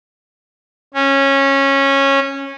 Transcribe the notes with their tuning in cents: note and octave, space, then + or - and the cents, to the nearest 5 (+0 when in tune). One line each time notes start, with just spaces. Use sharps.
C#4 -15